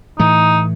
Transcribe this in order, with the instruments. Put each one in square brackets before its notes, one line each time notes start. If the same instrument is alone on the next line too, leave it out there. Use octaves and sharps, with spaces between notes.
[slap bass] A2 E3 A3 [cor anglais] D#4